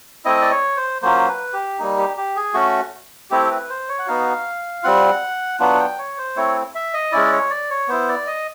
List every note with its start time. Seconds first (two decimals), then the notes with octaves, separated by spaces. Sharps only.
0.25 A3 C4 E4 D#5
0.41 D5
0.51 C#5
0.77 C5
1.02 F#3 A#3 C#4 F4 C5
1.28 B4
1.53 G4
1.79 G3 A#3 D#4
1.98 G4
2.17 G4
2.36 G#4
2.54 A3 C#4 F#4
3.30 A3 C4 E4 G4
3.51 B4
3.70 C5
3.89 C#5
3.99 F#5
4.07 B3 D#4 F#4 F5
4.83 G3 C4 F4 F#5
5.60 F#3 B3 D4 F4 F#5
5.80 G5
5.99 C#5
6.18 C5
6.36 A3 C4 E4 C#5
6.75 E5
6.94 D#5
7.12 G#3 C#4 E4 D5
7.25 D5
7.32 C#5
7.50 D5
7.70 C#5
7.88 B3 E4 C5
8.09 D5
8.27 D#5